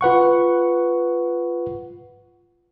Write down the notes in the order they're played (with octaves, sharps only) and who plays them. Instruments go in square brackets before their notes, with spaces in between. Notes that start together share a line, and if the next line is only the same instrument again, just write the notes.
[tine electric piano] F4 B4 F#5 C#6